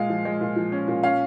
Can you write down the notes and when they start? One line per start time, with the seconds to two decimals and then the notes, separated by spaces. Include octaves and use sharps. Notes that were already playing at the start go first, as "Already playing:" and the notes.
Already playing: A#2 G#3 F5
0.09 F3
0.25 G#3
0.41 A#2
0.56 F3
0.72 C#4
0.88 A#2
1.03 C#4 F5